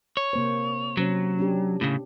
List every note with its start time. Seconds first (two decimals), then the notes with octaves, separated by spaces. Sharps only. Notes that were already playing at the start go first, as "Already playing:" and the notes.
0.17 C#5
0.33 C3 A#3 C5
0.97 C3 F#3 C#4 C5
1.38 C#4 D4 G4
1.81 A2 C#3